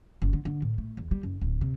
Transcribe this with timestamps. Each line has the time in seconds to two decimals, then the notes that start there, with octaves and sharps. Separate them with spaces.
0.22 F#1
0.33 D3
0.45 D3
0.62 A2
0.78 A3
0.97 E2
1.11 G3
1.23 F#1
1.41 D1
1.61 C3